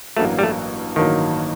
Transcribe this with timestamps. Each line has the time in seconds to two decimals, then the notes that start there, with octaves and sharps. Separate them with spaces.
0.17 A1 G2 F#3 A3 A#3 F#4
0.39 G3
0.43 A3
0.96 A1 G2 D#3 F#3 A#3 F#4